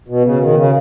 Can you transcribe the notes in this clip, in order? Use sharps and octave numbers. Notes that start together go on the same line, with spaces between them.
B2
C#3
D#3
C#3